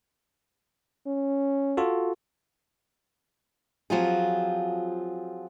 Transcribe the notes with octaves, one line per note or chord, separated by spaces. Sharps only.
C#4
F4 F#4 A4
F3 F#3 C4 F4 G4 G#4